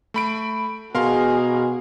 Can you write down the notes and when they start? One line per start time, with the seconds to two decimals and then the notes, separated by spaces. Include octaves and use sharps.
0.14 A3 B5 D7
0.95 B2 F#4 G#4 A#4 F5 C6